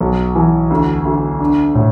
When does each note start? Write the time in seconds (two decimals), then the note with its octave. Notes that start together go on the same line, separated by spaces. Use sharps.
0.01 B1
0.35 E3
0.70 D2
1.05 D2
1.40 D4
1.75 A2